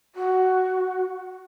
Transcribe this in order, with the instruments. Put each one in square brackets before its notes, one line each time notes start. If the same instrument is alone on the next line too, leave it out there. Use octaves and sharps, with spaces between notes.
[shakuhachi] F#4